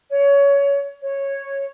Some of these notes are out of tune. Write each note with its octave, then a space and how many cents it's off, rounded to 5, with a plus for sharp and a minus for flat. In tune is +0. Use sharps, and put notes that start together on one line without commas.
C#5 +20
C#5 -10